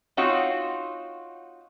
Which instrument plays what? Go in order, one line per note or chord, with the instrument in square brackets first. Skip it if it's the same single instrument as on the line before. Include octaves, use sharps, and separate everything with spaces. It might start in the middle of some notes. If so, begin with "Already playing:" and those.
[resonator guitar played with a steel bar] C4 D#4 F4 F#4 C#5